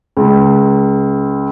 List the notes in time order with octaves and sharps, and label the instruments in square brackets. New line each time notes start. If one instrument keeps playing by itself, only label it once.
[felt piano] C#2